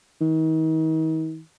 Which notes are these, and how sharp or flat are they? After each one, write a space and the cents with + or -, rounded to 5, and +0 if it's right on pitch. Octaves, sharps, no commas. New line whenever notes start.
D#3 +40